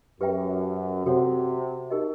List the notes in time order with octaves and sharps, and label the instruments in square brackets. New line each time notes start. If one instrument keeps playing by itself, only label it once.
[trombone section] F#2 [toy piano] G4 B4 E5 G5 A#5
[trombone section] C3 [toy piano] F#4 A4 C#5 F#5
[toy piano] D#4 G4 A#4 D#5